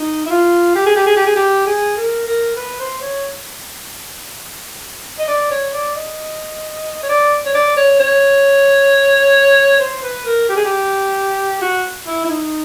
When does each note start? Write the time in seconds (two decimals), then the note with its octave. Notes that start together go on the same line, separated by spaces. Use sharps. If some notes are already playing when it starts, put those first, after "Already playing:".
Already playing: D#4
0.26 E4
0.31 F4
0.75 G4
0.86 G#4
0.96 G4
1.06 G#4
1.16 G4
1.27 G#4
1.36 G4
1.67 G#4
1.97 A#4
2.27 A#4
2.56 B4
2.80 C5
3.02 C#5
5.19 D#5
5.28 D5
5.51 C#5
5.73 D5
5.95 D#5
7.03 C#5
7.09 D5
7.46 C#5
7.55 D5
7.77 C#5
8.00 C#5
9.80 C5
10.03 B4
10.26 A#4
10.49 G4
10.56 G#4
10.64 G4
11.62 F#4
12.07 E4
12.25 E4
12.29 D#4